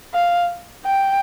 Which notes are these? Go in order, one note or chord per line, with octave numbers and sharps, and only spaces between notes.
F5
G5